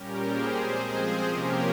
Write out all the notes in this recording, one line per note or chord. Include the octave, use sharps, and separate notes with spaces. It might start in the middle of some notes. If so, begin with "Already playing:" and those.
Already playing: A#2 G3 C#4 G4 A#4
G#4 C5
F3 G#3 C4
G#4 C5
C3 F3 A#3 C#4 G4 A#4